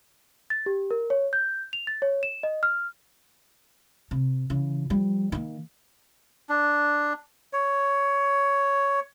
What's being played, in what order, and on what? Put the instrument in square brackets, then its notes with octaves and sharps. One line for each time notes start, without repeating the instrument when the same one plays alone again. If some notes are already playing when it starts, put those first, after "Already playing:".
[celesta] A6
G4
A#4
C#5
G6
F7
A6
C#5
E7
D#5
F6
[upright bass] C3
C#3 E3
F3 G3
D#3 A#3
[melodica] D4
C#5